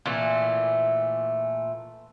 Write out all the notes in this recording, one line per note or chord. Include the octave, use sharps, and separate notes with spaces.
A#2 E3 A3